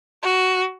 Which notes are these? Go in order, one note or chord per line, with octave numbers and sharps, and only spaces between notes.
F#4